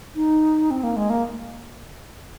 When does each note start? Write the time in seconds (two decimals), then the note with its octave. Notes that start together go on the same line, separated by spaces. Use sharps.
0.16 D#4
0.71 C4
0.83 A#3
0.97 G#3
1.10 A#3